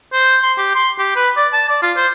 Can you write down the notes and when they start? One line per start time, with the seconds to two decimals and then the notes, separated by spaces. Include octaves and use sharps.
0.13 C5
0.43 C6
0.58 G4
0.75 C6
0.99 G4
1.16 B4
1.37 D5
1.53 A5
1.69 D5
1.83 F4
1.97 C5